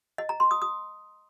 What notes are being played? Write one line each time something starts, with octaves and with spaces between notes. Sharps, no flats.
D#5
A#5
C6
D#6
D#6